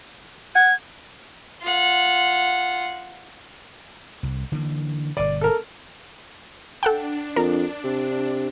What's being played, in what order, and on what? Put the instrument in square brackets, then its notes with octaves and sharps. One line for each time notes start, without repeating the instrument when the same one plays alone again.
[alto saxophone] F#5 [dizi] G#6
[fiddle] F4 F#5
[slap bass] C2
D3 E3 A#3
[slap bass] G1 B2 [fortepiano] D5
[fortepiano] A4 A#4
[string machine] D4 [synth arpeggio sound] A4 F#5 G5
[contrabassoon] F2 [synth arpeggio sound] A#4
[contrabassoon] C3